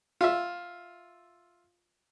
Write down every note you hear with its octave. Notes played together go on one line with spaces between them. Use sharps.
F4 E5